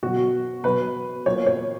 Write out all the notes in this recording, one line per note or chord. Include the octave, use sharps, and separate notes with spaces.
B2 F#3 F#4
B2 F#3 B4
A#2 F#3 C#5
C#5